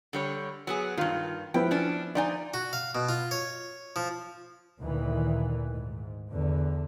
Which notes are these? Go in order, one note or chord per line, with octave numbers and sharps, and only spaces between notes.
D3 G3 C#5
F#3 B3 G#4
G2 D#3 F4
F3 B3 E4 G5
C#4 D4
F3 D#4 D5 G#5
F#4
F5
B2
F4
C#5
F3
D2 A#2 D#3 E3
G#2
E2 D3